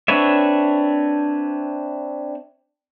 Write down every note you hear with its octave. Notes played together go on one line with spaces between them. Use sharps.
C4 D4 B4 C#5 E5